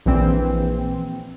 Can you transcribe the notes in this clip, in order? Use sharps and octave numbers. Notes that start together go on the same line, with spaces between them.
A#1 E3 C4